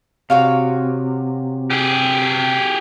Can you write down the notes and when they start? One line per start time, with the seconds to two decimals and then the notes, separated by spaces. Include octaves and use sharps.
0.30 C3 F#4 C#5 F5
1.70 G4 G#4